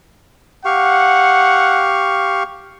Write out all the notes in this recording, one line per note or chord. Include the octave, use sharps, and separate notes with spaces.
G4 F5 F#5 C#6